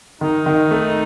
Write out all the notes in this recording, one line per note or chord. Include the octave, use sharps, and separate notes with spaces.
D#3 D#4
D#3
A3